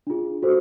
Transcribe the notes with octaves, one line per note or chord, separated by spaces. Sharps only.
D4 F4 G#4
F#4 A4 C5